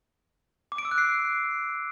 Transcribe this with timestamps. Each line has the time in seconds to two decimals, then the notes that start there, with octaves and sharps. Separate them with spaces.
0.72 D6
0.78 D7
0.85 E6
0.91 F#6
0.98 C7